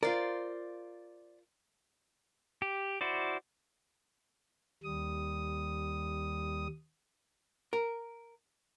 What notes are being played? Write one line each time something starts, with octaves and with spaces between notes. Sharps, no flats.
F4 A#4 C5 D5
G4
E4 F#4 C5 D5
D#2 G3 D#6
A#4